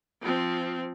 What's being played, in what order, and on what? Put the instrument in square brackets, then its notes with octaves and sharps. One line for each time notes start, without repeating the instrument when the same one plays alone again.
[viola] F3 C4